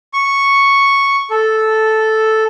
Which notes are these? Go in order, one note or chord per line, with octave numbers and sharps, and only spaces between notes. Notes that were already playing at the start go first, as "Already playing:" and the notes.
C#6
A4